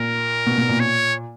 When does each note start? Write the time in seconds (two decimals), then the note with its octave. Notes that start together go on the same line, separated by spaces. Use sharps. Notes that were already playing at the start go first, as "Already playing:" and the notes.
Already playing: A#2 A#4
0.46 B2
0.58 B2
0.69 A#2
0.80 C#5